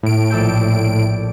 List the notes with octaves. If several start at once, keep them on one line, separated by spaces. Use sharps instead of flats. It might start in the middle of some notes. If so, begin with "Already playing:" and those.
A2 D7
A#1 A4 G5